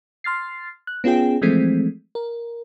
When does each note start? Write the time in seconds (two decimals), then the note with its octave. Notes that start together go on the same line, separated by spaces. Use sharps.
0.24 C6 F6 A6 C7
0.87 F#6
1.04 B3 C#4 F4 G#4 G5
1.42 E3 F3 G#3 A3 C4
2.15 A#4